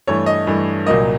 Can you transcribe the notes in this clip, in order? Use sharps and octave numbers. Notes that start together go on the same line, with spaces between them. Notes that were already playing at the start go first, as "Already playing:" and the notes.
G2 E3 A3 C#5
D#5
G2 E3 A3
C2 A#2 F#3 A#3 D#5